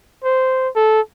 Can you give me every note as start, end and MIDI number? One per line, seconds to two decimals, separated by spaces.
0.24 0.69 72
0.76 1.01 69